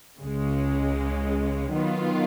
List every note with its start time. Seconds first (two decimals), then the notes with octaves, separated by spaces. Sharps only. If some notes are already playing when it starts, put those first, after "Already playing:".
0.20 C#2 C#3 G#3
1.73 D#3 F#3 B3 F4